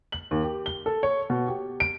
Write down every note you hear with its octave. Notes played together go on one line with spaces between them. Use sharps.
F#7
D#2
G4
G7
A4
C#5
B2
G4
D7